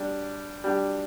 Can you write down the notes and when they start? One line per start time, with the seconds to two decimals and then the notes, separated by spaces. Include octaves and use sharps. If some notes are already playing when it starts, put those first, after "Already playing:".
Already playing: G3 D4
0.64 G3 D4 G4